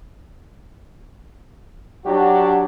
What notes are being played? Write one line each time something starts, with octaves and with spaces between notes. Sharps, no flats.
F#3 D4 F#4 G4